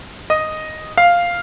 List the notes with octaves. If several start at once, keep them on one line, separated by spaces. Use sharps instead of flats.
D#5 D#6
F5 F6